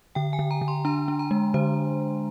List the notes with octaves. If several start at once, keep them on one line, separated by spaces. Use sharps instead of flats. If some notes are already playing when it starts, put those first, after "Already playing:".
D3 G5
G#5
D3
A#5
D3
C6
D4 A#5
D4
A#5
G#3
D3 C5